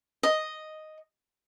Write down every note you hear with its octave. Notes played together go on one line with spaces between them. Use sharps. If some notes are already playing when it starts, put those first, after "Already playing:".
D#5